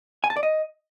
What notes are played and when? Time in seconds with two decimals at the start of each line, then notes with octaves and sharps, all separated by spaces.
0.24 G#5
0.30 A5
0.36 D5
0.43 D#5